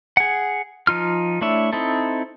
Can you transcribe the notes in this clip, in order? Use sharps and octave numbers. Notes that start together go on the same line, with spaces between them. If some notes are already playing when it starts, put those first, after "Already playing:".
G#4 F#5
F3 D#4 F4 F6
A3 D4 E4 C#5 E5
C4 D#4 E4 A4